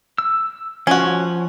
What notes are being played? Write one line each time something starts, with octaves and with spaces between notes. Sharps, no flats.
E6
F3 C#4 F#4